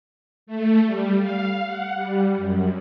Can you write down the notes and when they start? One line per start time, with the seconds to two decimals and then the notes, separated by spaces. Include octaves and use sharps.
0.47 A3
0.85 G3
1.19 F5
1.65 F#5
1.95 G3
2.37 F#2